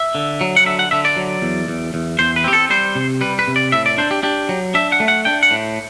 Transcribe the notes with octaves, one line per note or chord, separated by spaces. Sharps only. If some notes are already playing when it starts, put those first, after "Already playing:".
Already playing: E5
D3
F#3
F#5
D3 E5
F#5
D3 E5
D5
F#3
E2
E2
E2
E2 C5
B4
C4 G4
A4
G3 C5
C3
G3 B4
B4
C3
D5
A2 E5
D5
D4 C5
G4
D4 G4
F#3
D4 E5
F#5
A3
F#5
D4 G5
F#5
A2